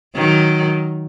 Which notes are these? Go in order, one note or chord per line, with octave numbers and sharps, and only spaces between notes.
D#3 F#3